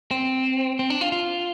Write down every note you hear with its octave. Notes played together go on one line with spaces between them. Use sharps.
C4
C4
D4
F4
F4